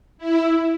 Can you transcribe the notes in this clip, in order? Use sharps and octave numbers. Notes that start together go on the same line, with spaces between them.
E4